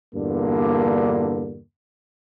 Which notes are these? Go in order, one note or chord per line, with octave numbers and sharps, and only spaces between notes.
E2 G2 A#2 D3 A#3